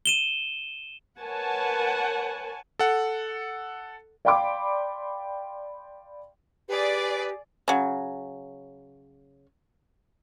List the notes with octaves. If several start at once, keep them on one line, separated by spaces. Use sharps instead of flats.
D#7 E7 G7
A#4 B4 C#5 F#5 G#5 A5
A4 F#5
D5 F5 G5 B5 C6 D6
G4 G#4 B4 D5
C#3 F#3